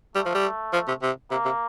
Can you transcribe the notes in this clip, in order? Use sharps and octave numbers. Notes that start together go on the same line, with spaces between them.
G3 A3
F3
G3
F3
C3
C3
C3 A#3
C3